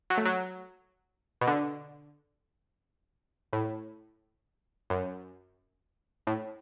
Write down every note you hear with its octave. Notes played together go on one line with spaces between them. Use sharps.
F#3
A3
F#3
B2
D3
A2
F#2
A2